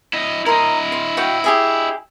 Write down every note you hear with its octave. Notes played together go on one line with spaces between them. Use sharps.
E4 D#5
E4 A#4 D#5 C6
C6
F#4 F5 G5
G4 G#4 E5